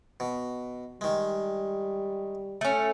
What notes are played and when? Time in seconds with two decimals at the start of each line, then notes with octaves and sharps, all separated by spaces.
0.20 B2
1.01 D#3 G3 G#3
2.61 A3 C#4